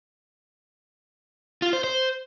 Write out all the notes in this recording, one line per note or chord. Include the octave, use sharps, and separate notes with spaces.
F4
C5
C5